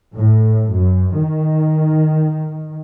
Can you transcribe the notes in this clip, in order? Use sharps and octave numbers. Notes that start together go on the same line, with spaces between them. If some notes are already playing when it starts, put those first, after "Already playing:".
A2
F#2
D#3